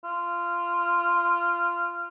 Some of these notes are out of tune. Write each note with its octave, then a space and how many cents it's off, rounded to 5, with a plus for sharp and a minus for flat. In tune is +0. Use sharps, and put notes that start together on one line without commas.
F4 -15